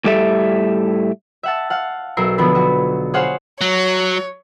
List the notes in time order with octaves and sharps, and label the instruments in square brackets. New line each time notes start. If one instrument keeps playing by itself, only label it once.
[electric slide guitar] A2 G3 G4 A4 E5
[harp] E5 F#5 A5
F5 F#5
B1 F#3 A#4 E5 C7
D3 F3 B3 D4 B4
F#4
G#4 C5 C#5 F5 F#5
[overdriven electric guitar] F#3 [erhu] C#5